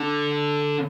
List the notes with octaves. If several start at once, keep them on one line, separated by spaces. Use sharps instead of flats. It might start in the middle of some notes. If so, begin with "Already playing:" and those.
Already playing: D3